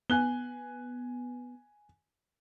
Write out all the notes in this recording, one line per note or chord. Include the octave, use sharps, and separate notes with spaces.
B3 G#5 F#6 G7